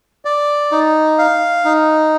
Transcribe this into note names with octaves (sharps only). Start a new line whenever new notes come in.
D5
D#4
F5
D#4